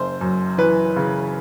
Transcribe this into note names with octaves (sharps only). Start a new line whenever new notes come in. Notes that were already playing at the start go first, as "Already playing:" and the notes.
Already playing: F#1 C5
F#2
E3 B4
C#3